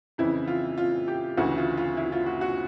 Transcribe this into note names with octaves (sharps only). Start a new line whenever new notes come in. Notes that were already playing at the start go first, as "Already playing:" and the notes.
F2 C#3 E3 E4
F4
F4
G4
D2 C#3 E3 F#4
F4
F4
E4
F4
F#4
F#4